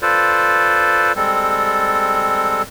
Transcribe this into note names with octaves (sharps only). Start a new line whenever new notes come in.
F4 A4 B4 C5 D5
G3 G#3 C4 A4